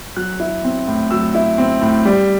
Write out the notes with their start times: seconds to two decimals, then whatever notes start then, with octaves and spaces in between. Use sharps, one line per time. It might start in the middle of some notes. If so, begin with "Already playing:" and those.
0.17 F#3 F#6
0.40 E4
0.64 C4
0.87 A2
1.11 F#3 E6
1.35 E4
1.58 C4
1.81 A2
2.05 G3